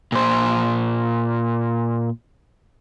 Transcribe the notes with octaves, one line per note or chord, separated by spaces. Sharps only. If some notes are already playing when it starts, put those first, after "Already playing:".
A#2 C5